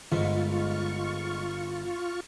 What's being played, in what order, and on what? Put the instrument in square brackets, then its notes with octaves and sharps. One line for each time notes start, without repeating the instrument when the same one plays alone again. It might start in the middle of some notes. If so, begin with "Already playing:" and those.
[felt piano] G1 [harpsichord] G#2 [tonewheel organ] F4 C#6